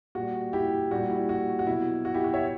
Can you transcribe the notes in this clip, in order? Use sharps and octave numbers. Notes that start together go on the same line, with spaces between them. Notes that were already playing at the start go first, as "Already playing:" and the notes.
A#2 G3 F#4
E4 G4
A#2 G3 F#4
E4
F#4
F#4
B2 F#3 E4
F#4
E4 G4
F#4
C#5 E5